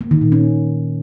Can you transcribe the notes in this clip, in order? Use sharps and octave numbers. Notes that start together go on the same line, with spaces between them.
A#3
D#3
A#2
C#4